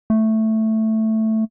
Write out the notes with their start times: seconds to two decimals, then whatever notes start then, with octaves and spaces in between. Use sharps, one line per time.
0.10 A3